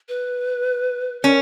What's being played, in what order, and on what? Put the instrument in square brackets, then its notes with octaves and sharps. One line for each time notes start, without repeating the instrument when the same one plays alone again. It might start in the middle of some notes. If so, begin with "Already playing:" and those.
[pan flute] B4
[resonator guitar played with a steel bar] C#4 [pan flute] A#4